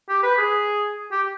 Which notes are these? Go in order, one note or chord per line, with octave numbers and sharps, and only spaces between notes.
G4
B4
G#4
G4